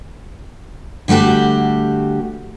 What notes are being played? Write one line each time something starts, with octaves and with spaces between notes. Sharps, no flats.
D3 G3 A3 F#4 G4